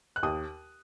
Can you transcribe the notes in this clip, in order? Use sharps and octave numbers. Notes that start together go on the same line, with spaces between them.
F#6
D#2 D#6